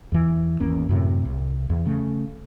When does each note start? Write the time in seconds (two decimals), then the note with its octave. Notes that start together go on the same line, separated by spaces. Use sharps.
0.12 E2 E3
0.60 G#1 E2 A#3 C#4
0.89 F#2 A2 C3
1.25 C2
1.70 E2
1.86 C#3 A3